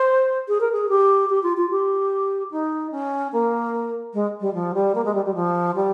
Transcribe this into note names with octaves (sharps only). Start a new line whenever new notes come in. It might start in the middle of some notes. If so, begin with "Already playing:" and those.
Already playing: C5
G#4
A#4
G#4
G4
G4
F4
F4
G4
D#4
C#4
A#3
G#3
G3
F3
G3
A#3
G#3
G3
G3
F3
G3